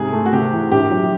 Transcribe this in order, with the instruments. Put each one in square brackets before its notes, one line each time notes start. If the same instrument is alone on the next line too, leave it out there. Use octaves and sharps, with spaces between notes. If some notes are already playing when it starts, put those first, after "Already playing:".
Already playing: [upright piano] G#2 C3 [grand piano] G#4
[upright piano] A3
[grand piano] F#4
[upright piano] C3 [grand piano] G4
[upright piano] E3
[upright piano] A#1 [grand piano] G4
[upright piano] F#3